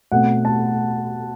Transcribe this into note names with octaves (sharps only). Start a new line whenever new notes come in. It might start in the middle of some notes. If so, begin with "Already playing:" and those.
B2 A3 C4 F#5
A5